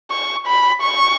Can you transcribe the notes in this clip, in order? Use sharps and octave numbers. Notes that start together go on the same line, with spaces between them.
C#6
B5
C#6